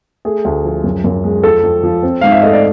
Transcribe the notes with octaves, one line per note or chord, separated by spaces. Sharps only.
A3 G#4
D2
F3
F#2
F#2
G#3
F2 A4
F2
F3
C4
G#2 F5
E5
A3 D#5
D5